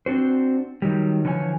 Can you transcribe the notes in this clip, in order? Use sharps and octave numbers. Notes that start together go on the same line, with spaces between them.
C4 D4 F#4 C5
D#3 F#3 G3
D3 E3 F3 C#5 F#5 G#5